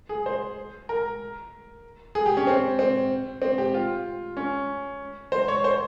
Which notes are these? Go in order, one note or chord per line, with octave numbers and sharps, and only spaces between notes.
G#4
C5
A#4
G#4
G4
C#4
C4
C4
C4
G4
F4
C#4
C5
C#5
C5